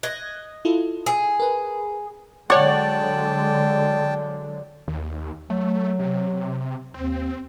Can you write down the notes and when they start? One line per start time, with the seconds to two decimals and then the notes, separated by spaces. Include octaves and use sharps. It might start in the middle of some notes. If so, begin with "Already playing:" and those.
0.03 D#5 F#6 G#6
0.65 E4 F4 A4
1.06 G#4
1.40 A#4 B4
2.50 D3 F#3 G#3 C#5 D5 F#5 G5 A5
4.88 D#2
5.50 F#3 A3
5.99 C3
6.94 D#2 C4